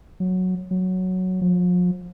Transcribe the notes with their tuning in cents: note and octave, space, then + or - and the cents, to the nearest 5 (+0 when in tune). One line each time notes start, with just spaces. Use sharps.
F#3 -5
F#3 +0
F3 +40